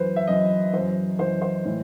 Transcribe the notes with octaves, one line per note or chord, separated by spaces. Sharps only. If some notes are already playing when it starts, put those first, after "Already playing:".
Already playing: F#2 E3 B4 C5
E5
F#2 E3 D#5
F#2 E3 C5
F#2 E3 C5
C5
A2 E3